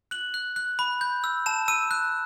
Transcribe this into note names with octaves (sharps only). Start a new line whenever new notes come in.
F#6 F#7
F#6
F#6
B5
G6
E6
A5 E7
E6 D#7
F#6